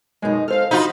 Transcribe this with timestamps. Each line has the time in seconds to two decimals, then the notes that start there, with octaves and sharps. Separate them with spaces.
0.22 F#2 B2 F3 G#3 D#4
0.48 A4 C5 F5 F6
0.71 F3 D#4 F4 F#4 B5